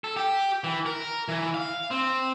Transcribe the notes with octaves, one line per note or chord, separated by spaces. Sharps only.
A4
G4
E3
A#4
E3
F5
C4